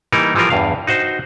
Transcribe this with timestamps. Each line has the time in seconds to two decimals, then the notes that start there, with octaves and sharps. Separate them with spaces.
0.12 E3 G3 A#3 D#4 A#4
0.35 E3 F3 G3 F4 A#4
0.50 E2 G2 F5
0.87 D#4 F#4 C5